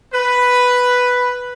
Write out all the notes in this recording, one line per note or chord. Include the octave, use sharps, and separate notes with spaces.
B4